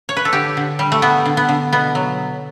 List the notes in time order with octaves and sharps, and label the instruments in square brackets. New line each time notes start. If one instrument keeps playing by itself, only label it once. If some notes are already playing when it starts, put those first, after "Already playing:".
[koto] C#5
B4
A4
D3 G4
D3
G3
A3
G3 B3
D3
B3
D3
B2 B3
F#3